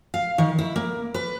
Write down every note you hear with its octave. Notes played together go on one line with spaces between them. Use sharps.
F5
D#3
E4
A#3
B4